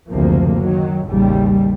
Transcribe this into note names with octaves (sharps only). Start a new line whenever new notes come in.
F#1 D2 C3 F3 A#3
D#3 F#3
A1 D#2 C#3 G3